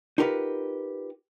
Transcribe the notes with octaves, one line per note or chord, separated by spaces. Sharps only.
D#4 F4 G4 A#4 B4 F#5